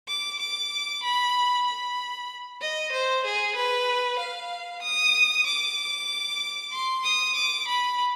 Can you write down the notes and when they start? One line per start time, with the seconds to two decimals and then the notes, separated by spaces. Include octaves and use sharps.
0.08 D6
0.40 D6
1.03 B5
1.66 B5
2.62 D#5
2.92 C5
3.25 G#4
3.56 B4
4.19 F5
4.82 D#6
5.46 D6
6.72 C6
7.04 D#6
7.35 D6
7.68 B5